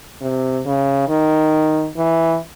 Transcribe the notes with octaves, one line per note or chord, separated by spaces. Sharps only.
C3
C#3
D#3
E3